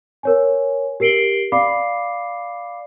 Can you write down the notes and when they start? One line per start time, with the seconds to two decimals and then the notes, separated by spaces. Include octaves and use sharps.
0.23 A#4 C#5 G#5
1.00 G4 A#4 C7 D7 F#7 G7
1.52 D5 F5 B5 D6 C7